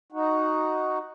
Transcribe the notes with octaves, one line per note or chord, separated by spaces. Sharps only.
D#4 F#4